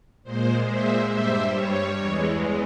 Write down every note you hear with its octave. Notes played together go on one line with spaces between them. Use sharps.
A#2 G#3 C5
C5 E5
G2 G3 C5 E5
C#5
E2 E3 G#3